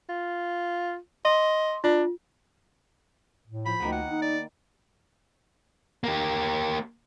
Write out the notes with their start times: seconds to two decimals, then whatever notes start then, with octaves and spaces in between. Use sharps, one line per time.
0.09 F4
1.25 D#5 C6
1.84 D4 F4
3.47 A2
3.66 F3 B5
3.80 D2 D#3 A#3 B3
3.92 F#5
4.09 D#4
4.22 D5
6.04 A#3 G4